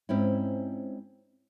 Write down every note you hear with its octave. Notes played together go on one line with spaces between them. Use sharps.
G#2 C4 C#4 E4